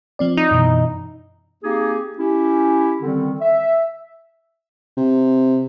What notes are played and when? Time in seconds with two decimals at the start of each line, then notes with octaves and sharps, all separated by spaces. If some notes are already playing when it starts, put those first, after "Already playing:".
0.19 F3 C4 D5
0.37 D#4
0.51 F#2 B2 E3
1.63 A#3 C4 D#4 G4 G#4
2.18 C#4 E4 G4
3.02 D3 D#3 G3 C4
3.42 E5
4.97 C3